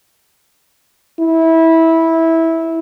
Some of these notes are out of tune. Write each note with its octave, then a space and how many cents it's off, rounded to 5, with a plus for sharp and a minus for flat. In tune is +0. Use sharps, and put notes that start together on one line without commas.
E4 -15